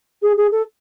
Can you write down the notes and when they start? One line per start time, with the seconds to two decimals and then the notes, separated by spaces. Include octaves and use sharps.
0.22 G#4
0.37 G#4
0.51 A4